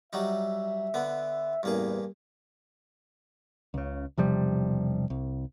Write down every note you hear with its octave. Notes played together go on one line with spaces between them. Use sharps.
F#3 G3 D#4 E5
D3 B3
A1 E2 G2 A#3 G#4
C#2 C#3
E1 C3 F3 G3
C2